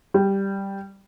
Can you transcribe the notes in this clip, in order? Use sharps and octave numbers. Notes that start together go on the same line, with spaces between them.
G3